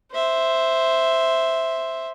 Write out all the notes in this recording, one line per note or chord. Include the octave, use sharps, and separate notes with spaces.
C5 E5